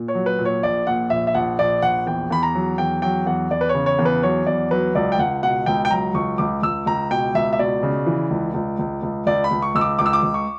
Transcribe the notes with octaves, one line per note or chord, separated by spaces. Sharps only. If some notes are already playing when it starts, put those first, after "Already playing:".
Already playing: A#2
C#5
F#3
B4
A#2
C#5
A#1 D5
A#2 F#5
A#1 E5
E5
A#1 F#5
A#1 D5
A#1 F#5
E2 G5
E2 B5
A#5
F#3
E2 G5
F#3 G5
E2 F#5
E2 D5
B4
C#5
C#3
C#5
E2
B4
F#3 C#5
E2 D5
F#3 B4
C#2 D5
G5
C#2 F#5
B2 F#5
C#2 G5
G5
F#3 A#5
C#2 C#6
C#2 D6
C#2 E6
C#2 A#5
B2 G5
C#2 E5
E5
B2 D5
C#3
E3
C#2
C#2
C#2
C#2
C#2 D5
B5
C#2
C#6
C#2 E6
D6
C#2 D6
E6
D6
C#2
C#6